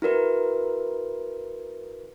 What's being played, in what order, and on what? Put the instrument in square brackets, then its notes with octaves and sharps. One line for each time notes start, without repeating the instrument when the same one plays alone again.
[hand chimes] E4 F#4 A#4 B4